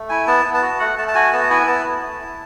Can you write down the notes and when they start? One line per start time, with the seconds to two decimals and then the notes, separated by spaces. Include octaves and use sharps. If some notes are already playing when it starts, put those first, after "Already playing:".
Already playing: A3
0.09 E4 G#5
0.27 B3 A5
0.45 B3
0.54 A5
0.62 F#4
0.79 A3 F#5
0.98 A3 A5
1.08 A5
1.15 F#4 G#5
1.33 B3 A5
1.50 E4 G#5
1.67 B3 A5
1.85 A3
2.02 A3
2.20 E4